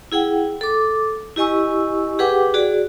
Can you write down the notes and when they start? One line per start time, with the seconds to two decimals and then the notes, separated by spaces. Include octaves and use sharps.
0.12 E4 G#4 F#5 G5
0.61 A4 D6
1.36 E4 G4 D#5 G#5 C#6 E6
2.19 G4 G#4 B4 F#5 G5 D6
2.54 F#4 G#4 D5